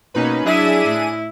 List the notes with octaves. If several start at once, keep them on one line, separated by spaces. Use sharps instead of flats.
B2 A#3 C#4 D#4 B4
F#3 D4 E4 G#4 E5 D#7
A2